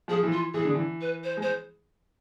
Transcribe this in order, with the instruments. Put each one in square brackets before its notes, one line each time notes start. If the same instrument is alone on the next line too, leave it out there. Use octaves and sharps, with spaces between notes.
[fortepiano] F3 [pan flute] G#4
[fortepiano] E3
[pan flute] F4
[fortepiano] E3 [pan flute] G#4
[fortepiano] D3
E3
[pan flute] B4
C5
[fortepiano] G#3
[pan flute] C5